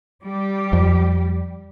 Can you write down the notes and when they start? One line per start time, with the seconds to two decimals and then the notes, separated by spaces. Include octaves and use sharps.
0.23 G3 G4
0.73 F2